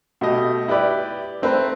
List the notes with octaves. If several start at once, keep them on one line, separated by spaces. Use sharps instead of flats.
B2 A3 G4 D#5
E4 G4 B4 D5
A3 C4 A#4 B4